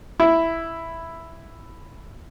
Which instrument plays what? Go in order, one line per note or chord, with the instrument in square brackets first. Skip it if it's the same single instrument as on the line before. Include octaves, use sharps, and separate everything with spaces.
[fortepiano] E4